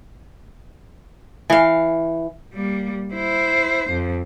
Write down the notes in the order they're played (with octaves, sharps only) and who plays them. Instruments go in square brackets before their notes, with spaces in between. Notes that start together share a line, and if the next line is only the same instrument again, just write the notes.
[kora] E3 F5
[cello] G3 A#3
E4 C5
F2